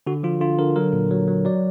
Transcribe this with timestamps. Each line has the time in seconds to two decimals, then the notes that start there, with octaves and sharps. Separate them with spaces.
0.07 D3 F#4
0.23 F3 F4
0.41 D3 F4
0.59 D3 A#4
0.76 F#3 A#4
0.93 A#2
1.11 F#3
1.28 F#3
1.45 F#3 D5